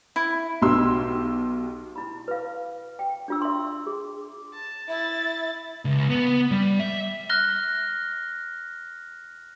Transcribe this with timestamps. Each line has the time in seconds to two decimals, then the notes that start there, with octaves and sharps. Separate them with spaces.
0.16 E4
0.62 B1 G4 C6 E6
1.96 E4 B5
2.28 B4 F5
2.99 G5
3.28 D4 F4 E6
3.42 E5 C6
3.87 G#4
4.54 A5
4.88 E4 E5 A6
5.85 C#2
6.10 B3
6.51 G3
6.80 E5
7.30 F6 F#6 A#6 G7